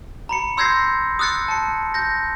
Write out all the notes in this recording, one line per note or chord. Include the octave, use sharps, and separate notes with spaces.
A#5 B5 C#7
C6 E6 G6 G#6 A#6 C7
D#6 E6 F#6 A6 C#7
A5 C#7
G6 A#6